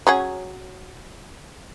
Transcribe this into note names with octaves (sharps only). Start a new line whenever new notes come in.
F#3 C#4 G#4